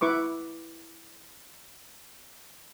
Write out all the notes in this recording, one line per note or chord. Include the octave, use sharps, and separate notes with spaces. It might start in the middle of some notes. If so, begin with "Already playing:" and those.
E4 B4 C#6 D6